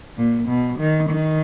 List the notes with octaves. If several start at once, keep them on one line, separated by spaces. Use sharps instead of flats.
A#2
B2
D#3
D#3